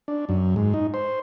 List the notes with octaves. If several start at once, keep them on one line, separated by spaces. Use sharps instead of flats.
D4
F#2
G#2
D#4
C5